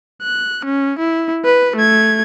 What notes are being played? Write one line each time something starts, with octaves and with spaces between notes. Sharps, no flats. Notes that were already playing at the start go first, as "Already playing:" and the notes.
F#6
C#4
E4
B4
A3 G#6